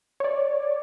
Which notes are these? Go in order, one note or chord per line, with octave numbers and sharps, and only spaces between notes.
C#5 D5